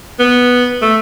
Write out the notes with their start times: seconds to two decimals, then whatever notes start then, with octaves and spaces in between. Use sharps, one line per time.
0.19 B3
0.82 A3